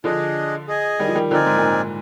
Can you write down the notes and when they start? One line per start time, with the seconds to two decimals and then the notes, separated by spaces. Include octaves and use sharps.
0.04 D3 F3 D4 G#4 D#5
0.68 G#4 D#5 G#5
0.99 D#3 G3
1.08 F3
1.15 D#3 G3
1.31 D3 F3 C4 D#4 A#4 D5 G#5
1.46 G#2
1.57 A#2
1.63 G#2